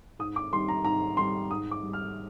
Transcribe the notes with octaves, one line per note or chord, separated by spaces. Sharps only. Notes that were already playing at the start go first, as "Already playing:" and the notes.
G#2 D#6
D6
D#3 G3 C6
A#5
G#2 A#5
D#3 G3 C6
G#2 D#6
D6
G3
F6